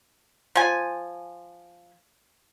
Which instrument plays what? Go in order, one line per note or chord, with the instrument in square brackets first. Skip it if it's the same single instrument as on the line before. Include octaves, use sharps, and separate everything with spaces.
[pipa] F3 G#5